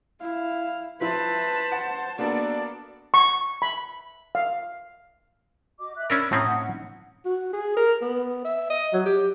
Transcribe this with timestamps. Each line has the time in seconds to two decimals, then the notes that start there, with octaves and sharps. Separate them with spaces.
0.21 E4 F5
1.01 F3 E4 B4 C5 A5
1.72 F#5
2.19 A#3 B3 D4 F#4 A4 D5
3.14 C#6
3.62 B5
4.35 F5
5.79 F#4 D#5 D6
5.97 E5 F#6
6.10 C#4 D4 A#4 B5 E6
6.32 A2 C4 C#4 A#5 D#6
6.45 D#4 F#5
7.25 F#4
7.53 G#4
7.77 A#4
8.02 B3
8.45 E5
8.70 D#5
8.93 F#3
9.06 G4